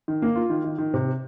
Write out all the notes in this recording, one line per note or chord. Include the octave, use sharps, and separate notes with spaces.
D#3
A#3
F4
D#3
D#3
D#3
C3